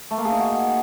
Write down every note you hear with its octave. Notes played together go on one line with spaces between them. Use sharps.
A3
A#3
G#4
D#4
F#4